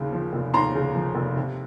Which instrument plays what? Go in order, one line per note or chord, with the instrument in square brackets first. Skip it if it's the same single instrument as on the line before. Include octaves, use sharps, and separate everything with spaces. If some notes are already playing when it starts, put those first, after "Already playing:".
Already playing: [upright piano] D#2 C#3
F3
F1
D#2 A#5 C6
C#3
F3
F1
C3